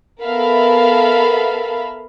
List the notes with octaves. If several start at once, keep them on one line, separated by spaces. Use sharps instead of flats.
B3 A4 A#4 E5 F5 B5